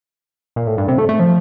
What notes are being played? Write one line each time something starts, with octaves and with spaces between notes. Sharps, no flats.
A#2
A2
G2
C3
A3
A3
F3